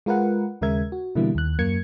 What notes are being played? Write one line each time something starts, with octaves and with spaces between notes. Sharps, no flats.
G#3 F4 A#4 B4 F#5
D#2 C#3 G#3 A#4 E5 G#6
F#4
B2 D3 E3 G3 A#3 E4
D#2 F#6
F#2 A#3 G#6 C#7